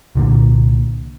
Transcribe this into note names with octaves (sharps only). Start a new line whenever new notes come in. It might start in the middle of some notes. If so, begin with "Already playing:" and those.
C2 A#2 D3 A#3